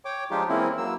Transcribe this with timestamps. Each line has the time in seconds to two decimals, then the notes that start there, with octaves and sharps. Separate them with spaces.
0.05 C#5 G5 D6
0.31 F3 G#3 D4 D#4 F4 G4
0.49 E3 G#3 A#3 C4 C#4 E4
0.78 F#3 A#3 E6